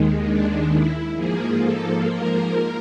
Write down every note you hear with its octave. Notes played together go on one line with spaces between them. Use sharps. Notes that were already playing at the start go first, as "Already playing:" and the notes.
Already playing: D#2 D#3 G#3
D4
E4
G#2 F3 A#3 G#4
A4
A#4